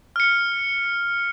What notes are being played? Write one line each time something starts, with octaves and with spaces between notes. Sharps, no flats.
F6 C#7